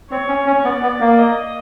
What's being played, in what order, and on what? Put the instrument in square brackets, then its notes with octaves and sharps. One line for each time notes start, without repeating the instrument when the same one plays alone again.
[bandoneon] C4 [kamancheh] C#5
[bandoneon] C#4
C#4
[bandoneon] B3 [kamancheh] D5
[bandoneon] B3
A#3
[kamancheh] D#5